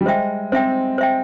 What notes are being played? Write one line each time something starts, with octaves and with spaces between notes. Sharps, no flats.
G3
G#3 C5 E5 G5
C4 C5 E5 G5
C5 E5 G5